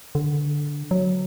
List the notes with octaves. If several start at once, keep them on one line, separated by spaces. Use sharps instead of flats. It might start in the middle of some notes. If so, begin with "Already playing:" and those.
D3
F#3